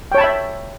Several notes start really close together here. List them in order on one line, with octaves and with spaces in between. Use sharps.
G5 C#5 A5 B5 E5